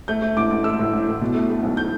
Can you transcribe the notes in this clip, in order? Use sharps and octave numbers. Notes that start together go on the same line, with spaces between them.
A3 G6
A3
A1 D6
A1
A3 E6
A2
A1
A2
B2
A3
A3
B1
G6